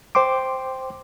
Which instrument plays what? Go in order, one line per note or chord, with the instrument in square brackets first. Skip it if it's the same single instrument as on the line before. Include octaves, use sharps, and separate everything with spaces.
[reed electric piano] C5 G5 C6 D6